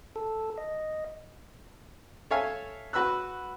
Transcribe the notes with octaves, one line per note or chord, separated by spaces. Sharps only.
A4
D#5
A4 C#5 E5 F5 G#5
F#4 B4 B5 E6 F#6